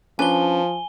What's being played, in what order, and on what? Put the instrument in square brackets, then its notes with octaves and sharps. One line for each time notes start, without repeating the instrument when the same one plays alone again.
[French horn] F3 [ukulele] C#4 D4 B4 [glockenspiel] G#5 G7